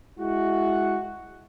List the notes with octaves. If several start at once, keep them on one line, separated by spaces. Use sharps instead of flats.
G#3 E4 F#4